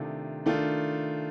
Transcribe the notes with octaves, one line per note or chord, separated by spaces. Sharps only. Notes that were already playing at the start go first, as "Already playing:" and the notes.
Already playing: C3 D#3 A3 D4 F4
D#3 A3 D4 F4